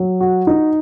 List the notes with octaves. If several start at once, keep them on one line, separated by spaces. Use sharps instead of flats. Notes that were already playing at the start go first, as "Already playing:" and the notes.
Already playing: F#3
F#4
D#4